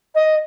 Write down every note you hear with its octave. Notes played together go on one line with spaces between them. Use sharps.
D#5